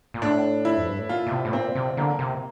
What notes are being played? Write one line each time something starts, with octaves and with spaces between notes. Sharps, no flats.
A#2
A2 D4
E4
F2
G2
A2
A#2 F4
A#2
C3
A2
A#2 C4
C3
D3 A#3
C3